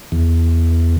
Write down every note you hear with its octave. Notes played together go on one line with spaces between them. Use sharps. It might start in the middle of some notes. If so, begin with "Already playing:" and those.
E2